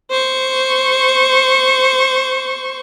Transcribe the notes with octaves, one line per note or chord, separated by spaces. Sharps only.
C5 C#6